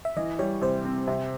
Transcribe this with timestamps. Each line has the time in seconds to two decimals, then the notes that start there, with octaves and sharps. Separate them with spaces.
0.05 E5
0.16 E3 D#5
0.39 G3 C#5
0.61 C3 C5
0.85 C4
1.07 C3